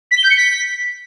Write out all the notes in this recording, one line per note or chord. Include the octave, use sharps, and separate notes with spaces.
B6
G7
G6
C#7
B6